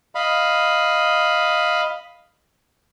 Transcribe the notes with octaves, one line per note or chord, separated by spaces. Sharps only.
D#5 F5 B5